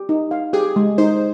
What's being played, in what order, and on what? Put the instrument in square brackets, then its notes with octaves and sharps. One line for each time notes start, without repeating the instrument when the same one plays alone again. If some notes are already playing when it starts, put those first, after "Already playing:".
Already playing: [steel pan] G4
D#4
F5
[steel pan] G4 [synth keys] G#4
[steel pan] G#3
[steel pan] D#4 [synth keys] C5